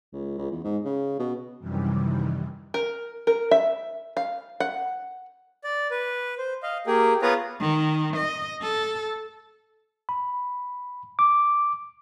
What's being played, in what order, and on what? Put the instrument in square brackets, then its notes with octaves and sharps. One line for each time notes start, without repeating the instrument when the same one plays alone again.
[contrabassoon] C#2
C#2
E2
G#2
C#3
B2
[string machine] F#2 C3 D#3 E3 G3
[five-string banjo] A#4
A#4
E5
F5
F#5
[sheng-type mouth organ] D5
B4
C5
D#5 F5
A#3 G4 G#4
B3 F4 G#4 B4 C#5 A#5
[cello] D#3
D#5
A4
[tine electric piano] B5
D6